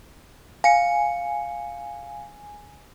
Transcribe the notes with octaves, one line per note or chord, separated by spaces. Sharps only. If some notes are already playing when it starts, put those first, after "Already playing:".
F5 G#5 C#7